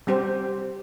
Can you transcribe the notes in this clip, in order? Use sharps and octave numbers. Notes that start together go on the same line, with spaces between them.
G3 C4 G4 C5